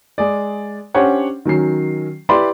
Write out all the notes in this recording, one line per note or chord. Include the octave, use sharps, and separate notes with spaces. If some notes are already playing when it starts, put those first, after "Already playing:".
G#3 G#4 D5
C#4 D4 G4 C5 C#5 F#5
D#3 F#3 C#4 C7
E4 G4 B4 D5 B5 C6